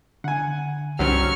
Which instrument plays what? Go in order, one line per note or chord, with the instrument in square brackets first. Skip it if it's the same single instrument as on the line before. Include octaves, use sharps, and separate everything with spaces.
[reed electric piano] D3 [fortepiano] F#5 G#5
[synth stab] C2 G2 D3 [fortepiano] F#3 C4 C#4 [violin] C#6 F6